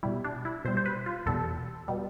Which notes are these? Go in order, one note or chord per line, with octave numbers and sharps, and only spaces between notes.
B2 G3 E4
D4
E4
B2 G3 C5
C5
B4
F4
E2 B2 G3 A4
B2 G3